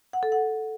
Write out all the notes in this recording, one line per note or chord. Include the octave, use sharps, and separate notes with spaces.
F#5
A4
F#5